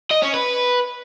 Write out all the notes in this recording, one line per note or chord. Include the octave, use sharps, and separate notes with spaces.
D#5
C#4
B4